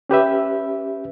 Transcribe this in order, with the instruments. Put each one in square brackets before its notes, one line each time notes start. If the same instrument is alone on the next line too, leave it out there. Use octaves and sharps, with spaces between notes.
[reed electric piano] C#4 G4 B4 E5